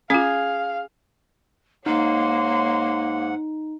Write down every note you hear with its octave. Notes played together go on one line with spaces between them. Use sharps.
C#4 F4 G#4 F5
G#2 A#3 D#4 C#5 F#5 C6